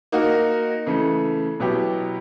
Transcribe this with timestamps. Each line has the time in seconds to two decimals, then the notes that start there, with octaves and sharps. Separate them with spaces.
0.12 A#3 D#4 F#4
0.86 C#3 E3 A3
1.60 B2 F#3 B3 E4 G4